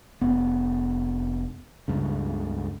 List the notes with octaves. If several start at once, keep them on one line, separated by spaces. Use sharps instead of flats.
F1 B3
C#2 G2 C#3